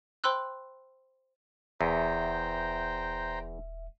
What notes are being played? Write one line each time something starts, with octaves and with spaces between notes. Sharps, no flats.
C5 G5 B5 C6 E6 F#6
D#1 E2 C5 E5 G5 A#5